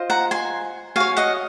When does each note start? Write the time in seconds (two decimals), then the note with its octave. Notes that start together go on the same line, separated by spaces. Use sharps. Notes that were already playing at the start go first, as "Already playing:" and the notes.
Already playing: F4 C5 D#5
0.10 F#5 A#5
0.31 G#5 C6
0.96 F#4 C#5 F5 G#5
1.17 D#5 F#5